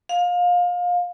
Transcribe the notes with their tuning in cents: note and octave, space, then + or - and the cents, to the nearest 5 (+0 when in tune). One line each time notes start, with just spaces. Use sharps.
F5 +25